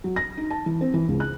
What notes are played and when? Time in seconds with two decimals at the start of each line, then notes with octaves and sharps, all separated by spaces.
0.04 F#3
0.16 A#6
0.37 D#4
0.51 A5
0.66 E3
0.81 C4
0.94 E3
1.08 C#2
1.20 F#6